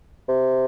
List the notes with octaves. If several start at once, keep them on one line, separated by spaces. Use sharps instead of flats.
C3